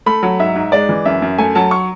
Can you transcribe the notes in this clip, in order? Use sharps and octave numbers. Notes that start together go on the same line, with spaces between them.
A3 B5
F#3
G#2 E5
G#2
G#3 D5
E3
F#2 E5
F#2
A3 G#5
F#3 A5
C#6